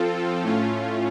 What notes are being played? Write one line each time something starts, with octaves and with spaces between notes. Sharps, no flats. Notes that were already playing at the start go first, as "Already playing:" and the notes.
Already playing: F3 C4 F4 A4
A2 A3 C#4 F4